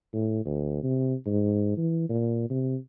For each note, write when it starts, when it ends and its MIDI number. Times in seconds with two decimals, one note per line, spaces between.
0.14 0.43 45
0.46 0.82 38
0.83 1.14 48
1.26 1.73 44
1.77 2.09 52
2.09 2.46 46
2.50 2.76 48